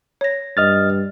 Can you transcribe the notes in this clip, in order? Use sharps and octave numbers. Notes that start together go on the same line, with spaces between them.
C#5 A#6
G2 D#5 F6 A6